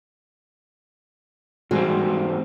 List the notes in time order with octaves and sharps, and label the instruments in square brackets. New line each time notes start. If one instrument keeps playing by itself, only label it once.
[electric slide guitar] E2 G#2 C4 [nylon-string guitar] G3 F#4 G#4